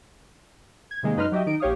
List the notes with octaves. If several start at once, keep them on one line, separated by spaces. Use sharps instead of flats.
G#6
C3 D#3 G#3 A#3
F#2 D#4 B4 D#5 C6 F6
F#3 G4 D#5 E5
D#3 D#4 D7
A#1 G4 C#5 F5 D#6